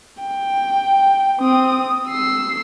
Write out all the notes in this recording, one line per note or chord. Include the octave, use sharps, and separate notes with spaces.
G5
C4 D#6
E6 C7